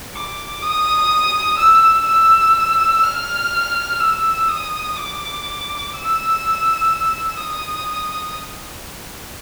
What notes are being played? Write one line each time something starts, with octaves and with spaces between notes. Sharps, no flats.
D6
D#6
E6
E6
F6
E6
D#6
D6
E6
D#6